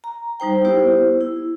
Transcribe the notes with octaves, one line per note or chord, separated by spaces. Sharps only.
A#5
G3 D#4 C5 G5
B3 E4 G4 C5
E4